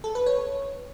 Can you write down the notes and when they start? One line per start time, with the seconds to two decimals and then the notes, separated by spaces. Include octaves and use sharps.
0.04 A4
0.15 B4
0.26 C#5